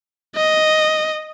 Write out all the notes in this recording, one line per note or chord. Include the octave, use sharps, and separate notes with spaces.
D#5